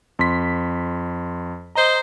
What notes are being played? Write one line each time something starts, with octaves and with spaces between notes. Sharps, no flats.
F2 C6 B6
C5 D#5 A#5